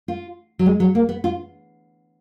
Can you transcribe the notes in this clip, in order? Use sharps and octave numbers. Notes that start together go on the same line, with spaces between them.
F4
F#3
G#3
F#3
A#3
B3
F4